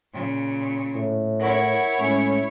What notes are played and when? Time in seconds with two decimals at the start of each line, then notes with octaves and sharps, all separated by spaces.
0.13 A#2 C#3
0.96 A2
1.40 E4 A#4 C#5 F#5 C#6
1.99 A2 G#3 C#4